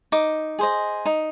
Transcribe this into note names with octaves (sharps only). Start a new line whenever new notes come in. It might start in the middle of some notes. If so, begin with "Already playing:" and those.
D#4 D6
G#4 C5 D#5
D#4